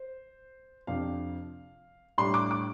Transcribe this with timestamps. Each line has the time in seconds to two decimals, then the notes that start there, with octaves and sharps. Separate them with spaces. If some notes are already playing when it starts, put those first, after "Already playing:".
Already playing: C5
0.87 F2 C3 F3 D4 F5
2.18 A2 G3 D4 C6
2.34 D6
2.51 D6